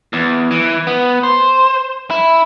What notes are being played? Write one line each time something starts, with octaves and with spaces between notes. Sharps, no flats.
E2
E3
B3
C5
E4